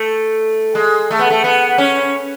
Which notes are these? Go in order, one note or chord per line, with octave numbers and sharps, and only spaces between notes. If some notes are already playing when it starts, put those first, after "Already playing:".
Already playing: A3
G#3
A3
B3
A3
B3
C#4